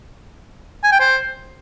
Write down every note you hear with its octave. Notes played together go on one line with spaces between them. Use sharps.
G#5
G5
C5